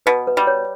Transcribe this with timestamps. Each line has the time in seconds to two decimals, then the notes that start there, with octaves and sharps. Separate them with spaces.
0.06 B2 B4
0.27 B4
0.37 G3
0.47 C#5